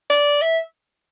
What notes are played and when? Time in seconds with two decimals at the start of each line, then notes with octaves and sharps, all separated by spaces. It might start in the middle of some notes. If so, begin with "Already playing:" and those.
0.10 D5
0.42 E5